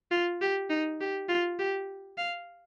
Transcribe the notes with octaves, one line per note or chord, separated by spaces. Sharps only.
F4
G4
D#4
G4
F4
G4
F5